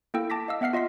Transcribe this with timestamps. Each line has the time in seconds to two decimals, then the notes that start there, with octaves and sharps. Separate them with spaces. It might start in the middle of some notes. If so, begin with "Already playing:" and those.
0.14 A#3 E4 A4 G5 E6
0.30 A5 D6 A#6 B6
0.48 D#5 F5 E6
0.61 B3 E5 F#5 F6 C7
0.73 F4 D#5 C6 B6